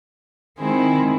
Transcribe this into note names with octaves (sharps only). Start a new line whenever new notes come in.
D#3 G#3 C4 E4 G#4